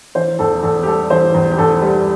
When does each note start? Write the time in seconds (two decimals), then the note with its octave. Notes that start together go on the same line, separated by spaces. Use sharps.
0.15 E3 C5
0.39 E2 A4
0.63 E2 A4
0.83 G4
0.87 G3 A4
1.10 E3 C5
1.34 E2
1.51 G4
1.58 E2 A4
1.82 G3